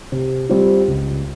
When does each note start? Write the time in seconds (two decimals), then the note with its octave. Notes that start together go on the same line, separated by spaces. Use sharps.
0.12 C3
0.49 G3 C4 F4
0.88 C#2